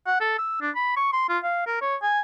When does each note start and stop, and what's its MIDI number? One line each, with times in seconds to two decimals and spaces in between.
0.07 0.18 78
0.20 0.35 69
0.38 0.58 88
0.61 0.70 62
0.75 0.95 83
0.96 1.10 85
1.13 1.25 84
1.29 1.38 65
1.43 1.63 77
1.67 1.80 70
1.81 1.96 73
2.02 2.21 80